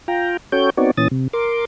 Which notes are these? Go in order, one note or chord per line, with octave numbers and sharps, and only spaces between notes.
F4 G5 A#5
C#4 F#4 A4 C#5 G5 G6
B3 C4 D#4 F#4 C#5 D5
A#2 E3 C#4 D#6 A6
C3
A#4 C6 D6